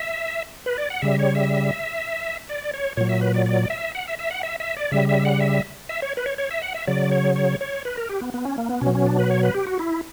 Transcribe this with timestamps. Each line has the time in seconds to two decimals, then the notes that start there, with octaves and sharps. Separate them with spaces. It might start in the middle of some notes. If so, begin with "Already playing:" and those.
Already playing: E5
0.66 B4
0.78 D5
0.90 F#5
1.02 C#3 G3 E5
1.19 C#5
1.35 E5
2.49 D5
2.74 C#5
2.97 A#2 F#3 C#5
3.09 E5
3.21 B4
3.34 D5
3.46 D5
3.70 E5
3.95 F#5
4.07 E5
4.19 E5
4.31 F#5
4.43 E5
4.60 E5
4.77 D5
4.92 C#3 G3 E5
5.09 E5
5.25 F#5
5.40 E5
5.89 E5
6.02 C#5
6.17 B4
6.26 C#5
6.38 C#5
6.51 E5
6.62 F#5
6.74 E5
6.87 C#3 F#3 D5
7.11 C#5
7.36 C#5
7.61 C#5
7.85 B4
7.97 A#4
8.09 G4
8.21 B3
8.34 B3
8.45 C#4
8.58 A#3
8.69 B3
8.81 B2 C#4
8.86 F#3
8.95 C#4
9.06 D4
9.19 B4
9.30 C#5
9.43 B4
9.55 G4
9.67 F#4
9.79 E4